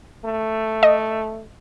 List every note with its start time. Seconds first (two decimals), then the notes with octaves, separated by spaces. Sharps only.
0.25 A3
0.83 D#5